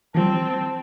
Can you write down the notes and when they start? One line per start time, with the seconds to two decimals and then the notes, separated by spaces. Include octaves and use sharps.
0.15 E3 F3 G3 C4 A5